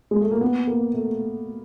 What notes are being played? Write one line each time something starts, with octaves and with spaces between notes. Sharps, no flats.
G#3
A3
A#3
B3
A#3
A3